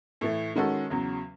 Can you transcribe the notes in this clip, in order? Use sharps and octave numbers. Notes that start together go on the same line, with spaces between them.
A2 E3 A3
D#3 G#3 C#4 F#4 A4
E2 C#3 F#3